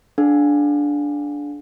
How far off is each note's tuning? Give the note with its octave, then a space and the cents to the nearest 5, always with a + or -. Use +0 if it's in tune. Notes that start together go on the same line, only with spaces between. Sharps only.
D4 -10 G#4 +45 F5 +35